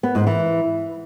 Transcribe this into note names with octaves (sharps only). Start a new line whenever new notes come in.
B3
G#2
E3